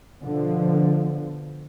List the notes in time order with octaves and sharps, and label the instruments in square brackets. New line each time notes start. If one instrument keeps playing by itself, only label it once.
[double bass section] B2 D3 F3